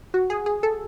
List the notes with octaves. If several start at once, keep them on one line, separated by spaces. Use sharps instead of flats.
F#4
G#4
G#4
A4